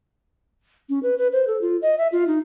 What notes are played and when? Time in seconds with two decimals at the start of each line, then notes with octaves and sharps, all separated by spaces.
0.89 C#4
1.03 B4
1.18 B4
1.33 C5
1.47 A4
1.62 F4
1.82 D#5
1.98 E5
2.12 F4
2.27 D#4